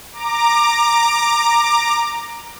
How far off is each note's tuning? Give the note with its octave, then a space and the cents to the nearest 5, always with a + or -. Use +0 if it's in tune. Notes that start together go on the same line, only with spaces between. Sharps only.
A#5 +0 D6 +20